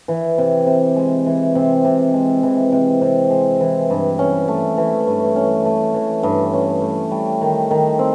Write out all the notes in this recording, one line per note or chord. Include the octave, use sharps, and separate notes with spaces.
E3
C3
C3
G#3
E3
C3
C3
G#3
E3
C3
C3
G#3
E3
G2
C#4
A3
E3
G2
C#4
A3
E3
G2
C#4
A3
G3
D#3
D#3
C4